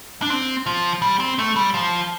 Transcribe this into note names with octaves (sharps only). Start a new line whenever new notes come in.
D4
C4
F3
G3
C4
A3
G3
F3